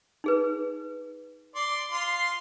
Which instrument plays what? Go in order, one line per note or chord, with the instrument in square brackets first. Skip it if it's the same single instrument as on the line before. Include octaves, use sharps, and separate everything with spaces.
[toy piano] D#4 G#4 B4
[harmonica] D5 C6
F4 C6